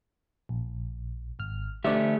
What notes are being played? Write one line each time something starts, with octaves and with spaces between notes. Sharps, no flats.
A#1
G#1 F6
D3 A3 G4 C5 D5 E5